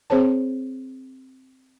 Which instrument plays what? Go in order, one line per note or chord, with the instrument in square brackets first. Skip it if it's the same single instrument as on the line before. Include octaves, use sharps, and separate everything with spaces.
[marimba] C4 G#4 C5 C#5 A5